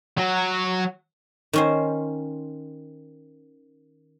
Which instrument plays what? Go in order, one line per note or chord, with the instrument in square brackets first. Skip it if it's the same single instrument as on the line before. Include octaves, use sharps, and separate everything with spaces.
[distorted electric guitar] F#3 F#4
[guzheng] D#3 C#4 C5